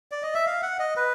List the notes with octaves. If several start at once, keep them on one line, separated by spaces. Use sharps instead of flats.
D5
D#5
E5
F5
F#5
D#5
B4